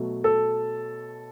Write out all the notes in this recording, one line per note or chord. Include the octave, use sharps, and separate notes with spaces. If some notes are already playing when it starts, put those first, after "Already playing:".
Already playing: B2 F#3 A3
A4